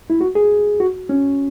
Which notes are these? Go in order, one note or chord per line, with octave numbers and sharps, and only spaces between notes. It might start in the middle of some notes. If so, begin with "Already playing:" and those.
E4
F#4
G#4
F#4
C#4